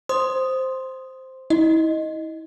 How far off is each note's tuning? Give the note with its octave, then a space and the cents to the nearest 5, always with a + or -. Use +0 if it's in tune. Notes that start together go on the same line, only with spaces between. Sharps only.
C5 +0 C6 +0 D#6 +0
E4 -35 D#5 +0